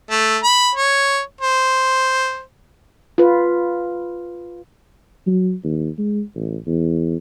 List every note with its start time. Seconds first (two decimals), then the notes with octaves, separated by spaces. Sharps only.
0.10 A3
0.43 B5
0.75 C#5
1.41 C5
3.18 F4 B4
5.26 F#3
5.64 D#2
5.98 G#3
6.35 A1
6.67 E2